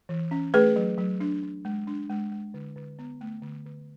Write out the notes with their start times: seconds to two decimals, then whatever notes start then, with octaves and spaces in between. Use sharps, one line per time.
0.09 E3
0.31 C#4
0.54 A3 G#4 B4
0.76 F#3
0.98 F#3
1.20 D4
1.43 D4
1.65 G#3
1.87 D4
2.10 G#3
2.32 G#3
2.54 D3
2.76 D3
2.99 B3
3.21 A3
3.42 D3
3.66 D3